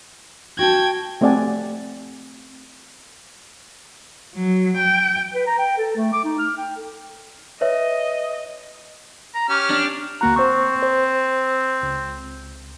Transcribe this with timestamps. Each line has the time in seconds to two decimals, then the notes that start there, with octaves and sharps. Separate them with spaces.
0.59 F#4 G5 A5 G#6
1.21 A3 C4 G4 D5 F#5 G#5
4.35 F#3
4.78 G5
5.34 B4
5.47 A#5
5.58 G5
5.78 A4
5.96 A3
6.13 D6
6.24 D#4
6.39 F6
6.58 G5
6.76 A4
7.61 B4 C#5 D#5 E5
9.35 A#5
9.49 C#4 G4 F6
9.71 D4
10.21 D2 A#3 F#4 A#5
10.36 C4 C5 C#6
10.83 C5
11.83 C#2